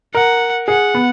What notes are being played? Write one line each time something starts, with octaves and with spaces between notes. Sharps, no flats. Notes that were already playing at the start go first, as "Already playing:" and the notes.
A#4 F#5
G#4 F#5
B3